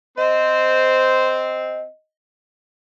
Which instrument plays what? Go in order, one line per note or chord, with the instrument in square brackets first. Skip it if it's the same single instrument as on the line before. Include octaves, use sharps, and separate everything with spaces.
[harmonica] C4 C5 [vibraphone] D#5